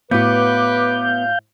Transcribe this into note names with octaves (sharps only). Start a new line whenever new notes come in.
A2 B3 F#4 B4 F5 D6 G6